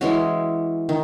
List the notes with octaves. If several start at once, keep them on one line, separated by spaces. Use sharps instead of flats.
E3 G#3 C#4 F#4
D#3